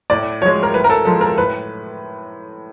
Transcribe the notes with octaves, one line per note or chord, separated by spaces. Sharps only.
A2 D5
F3 G#3 C#5
A#4
A2 B4
A#4
A4
F3 G#3 A4
A#4
A2 B4